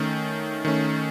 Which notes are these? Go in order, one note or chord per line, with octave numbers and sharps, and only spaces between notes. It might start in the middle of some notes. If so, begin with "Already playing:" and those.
Already playing: D#3 A3 C#4
D#3 A3 C#4